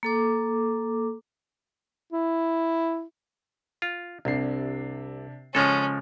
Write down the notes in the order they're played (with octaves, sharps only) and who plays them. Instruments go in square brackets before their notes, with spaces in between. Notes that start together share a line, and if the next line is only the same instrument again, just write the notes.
[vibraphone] A#3 A4 D6
[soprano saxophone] E4
[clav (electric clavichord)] F4
[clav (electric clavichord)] C2 [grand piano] C3 D4 C7
[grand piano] C#3 F7 [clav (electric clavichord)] F3 G#3 A4 [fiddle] C#4